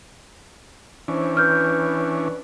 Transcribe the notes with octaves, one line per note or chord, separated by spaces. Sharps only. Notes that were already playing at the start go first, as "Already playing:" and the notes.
E3 C#4 D4 C5
B4 F6 G6